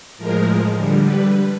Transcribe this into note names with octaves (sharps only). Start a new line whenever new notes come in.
A2 F3 G#3 A#4
D3 G3
B4